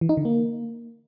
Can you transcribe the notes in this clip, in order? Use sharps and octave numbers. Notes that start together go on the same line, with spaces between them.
E3
D#4
D3
A#3